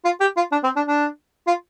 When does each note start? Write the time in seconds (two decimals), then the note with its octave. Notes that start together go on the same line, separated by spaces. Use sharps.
0.05 F4
0.21 G4
0.37 F4
0.52 D4
0.64 C4
0.76 D4
0.87 D4
1.47 F4